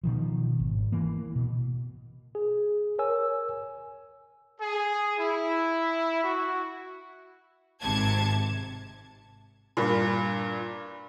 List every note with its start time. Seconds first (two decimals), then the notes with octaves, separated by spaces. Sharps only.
0.03 B2 D#3 F3
0.59 G#1
0.92 E3 A#3
1.36 B2
2.35 G#4
2.99 A#4 C#5 G#5 E6
4.60 G#4
5.19 E4
6.23 F#4
7.81 G#1 C3 A5 G#6
9.77 G2 A#2